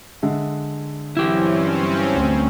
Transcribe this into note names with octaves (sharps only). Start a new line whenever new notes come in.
D3 G#3 E5
G2 E3 F#3 C4 C#4 E4 G4
D2 C#4